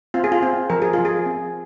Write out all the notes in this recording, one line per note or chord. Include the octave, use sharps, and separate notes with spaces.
C4 F4
G#4
F4
C4
F3 A#4
G#4
F3 F4
G#4
C4